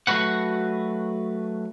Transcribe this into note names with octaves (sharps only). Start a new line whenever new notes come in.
F#3 A3 F#4 B4 F#5